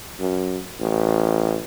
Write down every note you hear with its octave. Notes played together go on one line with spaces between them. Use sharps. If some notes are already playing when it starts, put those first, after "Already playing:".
F#2
A1